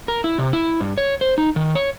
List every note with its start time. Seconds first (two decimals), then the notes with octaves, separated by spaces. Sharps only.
0.08 A#4
0.24 E4
0.38 C3
0.53 E4
0.81 G2
0.98 C#5
1.21 C5
1.38 D#4
1.56 D#3
1.75 C#5